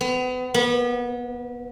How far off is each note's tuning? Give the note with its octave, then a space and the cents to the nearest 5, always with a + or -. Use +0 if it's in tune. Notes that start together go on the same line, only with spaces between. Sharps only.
B3 +35
B3 -30